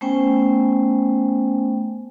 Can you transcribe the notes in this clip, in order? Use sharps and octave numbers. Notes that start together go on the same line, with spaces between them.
A3 B3 C#4 C5 G5 G#5